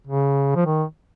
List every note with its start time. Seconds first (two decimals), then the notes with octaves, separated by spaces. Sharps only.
0.07 C#3
0.56 F3
0.66 D#3